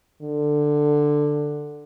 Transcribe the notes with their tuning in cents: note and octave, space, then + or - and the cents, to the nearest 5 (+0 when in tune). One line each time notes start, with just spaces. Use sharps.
D3 +10